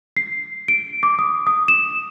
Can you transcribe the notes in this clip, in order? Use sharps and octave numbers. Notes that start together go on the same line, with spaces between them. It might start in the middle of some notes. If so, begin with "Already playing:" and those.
C7
D7
D6
D#6
D#6
E7